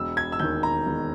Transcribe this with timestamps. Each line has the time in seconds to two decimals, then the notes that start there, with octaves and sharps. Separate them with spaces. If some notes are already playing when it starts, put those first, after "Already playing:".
Already playing: E1 E6
0.17 G#6
0.32 E6
0.39 D#2 D#3 G6
0.63 A#5
0.87 E1